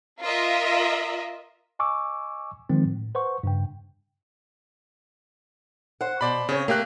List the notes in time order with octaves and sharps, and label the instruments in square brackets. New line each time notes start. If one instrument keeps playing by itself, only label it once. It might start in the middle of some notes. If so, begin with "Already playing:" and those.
[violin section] F4 A#4 D#5 E5
[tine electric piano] D#5 G#5 C#6 D6 E6
D#3 F3 G#3 C4
A2
B4 C5 F#5 C#6
G2 C#3 G5
[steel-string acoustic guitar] C5 F#5
[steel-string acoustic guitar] B2 [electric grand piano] C5 D5 B5
[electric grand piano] C#3 [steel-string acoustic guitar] C4 C#5
[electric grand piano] A3 G4 F#6 [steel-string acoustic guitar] A#3